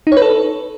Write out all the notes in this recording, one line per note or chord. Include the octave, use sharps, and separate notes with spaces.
D#4
C#5
B4
A4